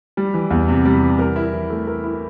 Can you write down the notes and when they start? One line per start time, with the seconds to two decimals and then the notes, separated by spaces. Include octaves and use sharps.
0.17 G3
0.34 E3
0.51 E2
0.68 C3
0.85 G3
1.02 E3
1.19 A#4
1.36 E4
1.53 E3
1.70 A3
1.87 A#4
2.04 E4